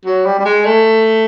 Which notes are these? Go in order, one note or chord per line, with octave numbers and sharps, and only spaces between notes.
F#3
G3
G3
G#3
A3